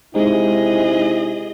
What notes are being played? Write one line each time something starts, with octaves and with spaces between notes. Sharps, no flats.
C3 G#3 D#4 E4 G#4 D#5